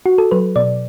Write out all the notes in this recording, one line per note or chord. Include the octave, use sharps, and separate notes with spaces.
F#4
A4
F#3 B4
B2 D5